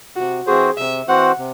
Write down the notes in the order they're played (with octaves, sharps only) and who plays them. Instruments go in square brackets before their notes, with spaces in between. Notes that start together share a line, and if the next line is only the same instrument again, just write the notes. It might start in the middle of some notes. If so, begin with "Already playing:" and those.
[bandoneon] C3 [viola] F#4
[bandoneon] E3 C4 F#4 C5 [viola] G#4
[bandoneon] C3 [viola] E5
[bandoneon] E3 C4 F#4 C5 [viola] F#5
[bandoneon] C3